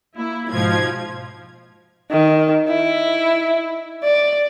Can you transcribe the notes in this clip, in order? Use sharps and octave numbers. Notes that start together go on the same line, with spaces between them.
A#3 E4
G#2 B2 F3 G#6
D#3
E4
D5